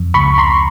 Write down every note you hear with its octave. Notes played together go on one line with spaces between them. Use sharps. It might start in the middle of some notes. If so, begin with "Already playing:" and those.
Already playing: F2
C#2 B5 C#6
A#5 C6